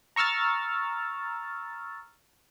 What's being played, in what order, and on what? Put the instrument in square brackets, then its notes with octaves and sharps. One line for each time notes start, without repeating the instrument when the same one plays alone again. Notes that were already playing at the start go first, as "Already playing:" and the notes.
[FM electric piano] A#5 C#6 E6 F6 A6